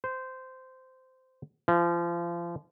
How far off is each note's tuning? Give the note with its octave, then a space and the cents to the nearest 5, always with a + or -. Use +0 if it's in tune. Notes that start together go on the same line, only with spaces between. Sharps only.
C5 -15
F3 -30